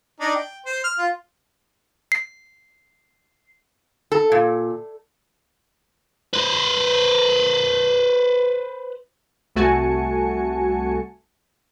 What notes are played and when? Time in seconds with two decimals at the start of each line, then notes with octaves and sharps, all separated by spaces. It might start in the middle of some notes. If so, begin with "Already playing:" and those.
0.20 D4 D#4
0.35 G5
0.66 C5
0.84 F6
0.98 F4
2.12 C7
4.12 A4
4.32 A#2
6.34 B4 C5
9.56 C2 A3 F#4 G#5 A5 C#7